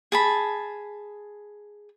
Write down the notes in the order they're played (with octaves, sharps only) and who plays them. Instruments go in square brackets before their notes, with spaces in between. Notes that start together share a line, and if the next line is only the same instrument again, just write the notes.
[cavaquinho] G#4 A5 B5